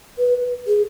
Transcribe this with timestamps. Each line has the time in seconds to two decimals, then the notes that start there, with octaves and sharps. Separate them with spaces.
0.19 B4
0.67 G#4